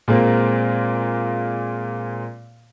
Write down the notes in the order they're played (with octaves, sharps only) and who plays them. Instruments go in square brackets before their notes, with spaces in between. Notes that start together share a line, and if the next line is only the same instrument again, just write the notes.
[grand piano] A#2 G#3 A#3 C4